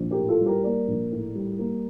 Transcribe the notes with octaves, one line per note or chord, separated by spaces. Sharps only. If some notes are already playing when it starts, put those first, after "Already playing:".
Already playing: A#1
G4 A#4
A2
F4 A4
G3
G4 A#4
A#3 A#4 D5
A#1
A2
G3
A#3